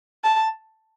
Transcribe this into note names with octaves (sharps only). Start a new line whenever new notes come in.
A5